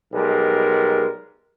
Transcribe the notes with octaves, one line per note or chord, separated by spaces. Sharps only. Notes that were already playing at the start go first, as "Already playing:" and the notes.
B1 G3 G#3 A#4